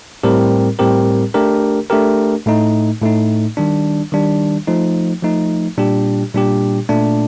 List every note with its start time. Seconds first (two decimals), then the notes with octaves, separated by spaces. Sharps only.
0.23 A2 G3 C4 G4 A#4
0.79 A2 G3 C4 G4 A#4
1.34 A3 D4 G4 A#4
1.90 A3 D4 G4 A#4
2.46 A2 A3 D#4
3.01 A2 A3 D#4
3.57 D#3 G3 D4
4.12 D#3 G3 D4
4.67 F3 A3 D#4
5.22 F3 A3 D#4
5.78 A#2 G3 D4 G4
6.34 A#2 G3 D4 G4
6.89 A#2 A3 D4